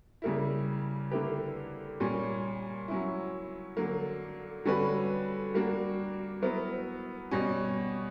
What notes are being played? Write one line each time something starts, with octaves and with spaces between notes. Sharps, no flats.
C#3 G3 A#3 E4
D3 A#3 E4 G4 B4
A#2 G3 C#4
F#3 C#4 E4
D3 F#3 A#3
D3 G3 C#4 F#4 B4
G3 A#3 D4 F#4
F#3 B3 E4 A#4
B2 G3 C#4